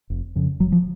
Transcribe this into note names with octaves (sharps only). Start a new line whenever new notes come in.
F1
F2 C#3
F1 F#3
F3